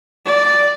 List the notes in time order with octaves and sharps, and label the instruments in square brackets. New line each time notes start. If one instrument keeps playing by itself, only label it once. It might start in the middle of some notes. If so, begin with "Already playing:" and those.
[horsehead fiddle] D5